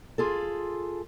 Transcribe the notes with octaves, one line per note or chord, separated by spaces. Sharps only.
F4 G#4 A4